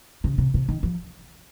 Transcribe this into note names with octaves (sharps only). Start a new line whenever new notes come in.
C#3
C3
C3
D#3
F3